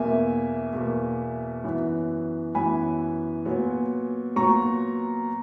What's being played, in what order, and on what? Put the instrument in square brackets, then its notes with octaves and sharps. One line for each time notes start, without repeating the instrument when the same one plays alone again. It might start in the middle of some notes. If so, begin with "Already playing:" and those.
Already playing: [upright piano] E2 B2 A#3 E5 G#5
E2 B2 A#3
F#2 E3 B3
F#2 E3 B3 G#5 B5
A#2 F#3 B3
A#2 F#3 B3 A#5 C#6